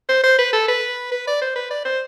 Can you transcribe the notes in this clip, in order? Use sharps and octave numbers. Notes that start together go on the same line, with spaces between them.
C5
C5
B4
A4
B4
B4
D5
C5
B4
D5
C5